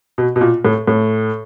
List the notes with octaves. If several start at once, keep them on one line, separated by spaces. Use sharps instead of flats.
B2
B2
A#2
A2
A2